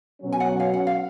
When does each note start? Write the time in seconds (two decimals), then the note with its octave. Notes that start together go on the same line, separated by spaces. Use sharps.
0.21 B2 F#3 C#4
0.32 G#5
0.40 F#5
0.60 F5
0.73 F#5
0.87 F5